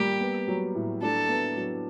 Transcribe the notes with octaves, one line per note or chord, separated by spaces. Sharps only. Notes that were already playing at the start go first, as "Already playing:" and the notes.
Already playing: G3 A#3 G4
B3
F#3
A2
D4 A4
B3
F#3